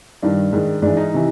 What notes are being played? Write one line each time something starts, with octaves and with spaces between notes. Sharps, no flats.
G2 D#3 D4
G#2 D#3
G#2 E3 D4
D#4
C3 E3